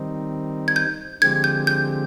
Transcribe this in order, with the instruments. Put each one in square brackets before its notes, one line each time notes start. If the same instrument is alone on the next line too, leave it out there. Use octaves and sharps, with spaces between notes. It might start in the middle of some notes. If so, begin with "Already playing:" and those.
Already playing: [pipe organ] D#3 G3 C4 D#4
[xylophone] G#6
G6
[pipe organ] D3 F3 G#3 C4 G4 [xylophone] G#6
[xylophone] G6
G6